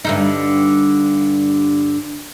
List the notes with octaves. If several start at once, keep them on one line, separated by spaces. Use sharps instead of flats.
G2 D3 D#4